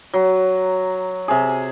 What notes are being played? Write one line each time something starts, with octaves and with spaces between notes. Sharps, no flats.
F#3
C3 G#4